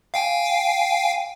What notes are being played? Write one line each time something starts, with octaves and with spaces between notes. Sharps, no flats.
F5 G5 G#5